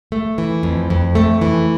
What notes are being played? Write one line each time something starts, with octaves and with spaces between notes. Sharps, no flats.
A3
E3
F2
F2
A3
E3